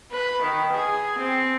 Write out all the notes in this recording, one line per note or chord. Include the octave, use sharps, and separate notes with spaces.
B4
D#3
G#4
C4